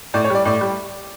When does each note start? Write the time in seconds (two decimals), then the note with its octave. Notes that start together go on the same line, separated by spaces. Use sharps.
0.14 A2 D5
0.24 C#5
0.30 G3 D5
0.45 A2 D5
0.61 G3